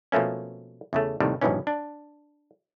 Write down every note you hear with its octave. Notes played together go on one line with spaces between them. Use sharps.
B2 F3 A3 A#3 C#4
E2 C#3 A3
D#2 A2 C3 D#3 G3
A#1 G2 B2 D#3 E3 C#4
D4